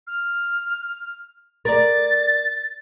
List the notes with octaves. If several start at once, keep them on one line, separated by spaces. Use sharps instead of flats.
F6
A#4 D5 A6